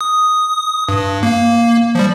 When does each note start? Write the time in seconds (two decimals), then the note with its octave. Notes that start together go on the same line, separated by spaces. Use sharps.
0.01 D#6
0.89 G2
1.23 A#3
1.95 F3 G3